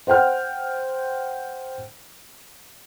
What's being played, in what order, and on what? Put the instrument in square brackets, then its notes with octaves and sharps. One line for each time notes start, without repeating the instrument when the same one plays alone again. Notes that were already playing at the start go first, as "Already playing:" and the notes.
[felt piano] C5 F#5 G5 F6